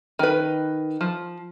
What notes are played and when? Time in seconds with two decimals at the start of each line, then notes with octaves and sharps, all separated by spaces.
0.19 D#3 B4
1.01 F3